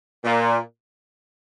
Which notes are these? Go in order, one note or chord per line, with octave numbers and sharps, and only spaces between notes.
A#2